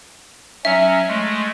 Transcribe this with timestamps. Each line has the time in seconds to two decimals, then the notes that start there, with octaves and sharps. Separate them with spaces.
0.65 F#3 C#4 E5
1.08 G#3 A3